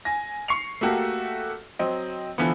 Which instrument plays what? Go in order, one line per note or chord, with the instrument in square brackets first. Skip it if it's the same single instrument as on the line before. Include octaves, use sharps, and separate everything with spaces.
[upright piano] G#5 A#6
C#6 C7 C#7 F7
A3 A#3 F#4 G4 A4
F#3 C4 D#5
D3 E3 F3 B3